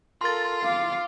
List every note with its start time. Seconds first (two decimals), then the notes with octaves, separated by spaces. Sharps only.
0.21 F4 A4 A#4 C6 A6
0.64 F5 D6